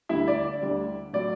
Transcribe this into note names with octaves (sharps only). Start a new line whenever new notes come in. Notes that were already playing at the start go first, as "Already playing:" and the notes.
D2 D3 G3 E4 E5
D5
D5
D2 D3 G3
A2 F#3 D5